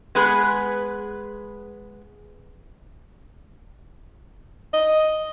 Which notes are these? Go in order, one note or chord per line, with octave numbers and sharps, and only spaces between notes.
G#3 B3 G#4 B4
D#5